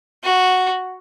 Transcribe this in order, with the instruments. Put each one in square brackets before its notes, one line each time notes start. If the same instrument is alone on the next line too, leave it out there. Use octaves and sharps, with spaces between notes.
[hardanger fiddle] F#4